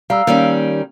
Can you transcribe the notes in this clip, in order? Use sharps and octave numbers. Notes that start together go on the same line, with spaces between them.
G3 F5 A#5 E6
D#3 G3 A#3 C#4